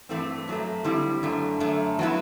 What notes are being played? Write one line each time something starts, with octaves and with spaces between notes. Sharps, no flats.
G2 E3 A3 C4
F#2 F#3 A3
D3 G3 C4 E4
F#2 D3 A3
F#2 D3 A3
F#3 B3 E4